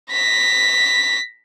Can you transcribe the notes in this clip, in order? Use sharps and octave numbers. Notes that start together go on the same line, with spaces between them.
A#6 B6